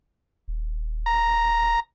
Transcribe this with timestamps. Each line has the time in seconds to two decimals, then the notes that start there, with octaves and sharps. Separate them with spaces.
0.48 D#1
1.06 A#5